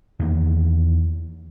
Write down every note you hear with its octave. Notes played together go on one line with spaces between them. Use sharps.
E2 D#3 A#3